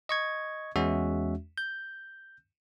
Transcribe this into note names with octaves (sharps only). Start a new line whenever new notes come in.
D#5 C#6 G#6
E2 G#3 C#4 F#4 E5
G6